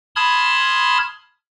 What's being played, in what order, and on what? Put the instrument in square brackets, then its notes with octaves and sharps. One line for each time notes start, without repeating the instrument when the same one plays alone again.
[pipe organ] A5 B5 C6 D#6 F6 G#6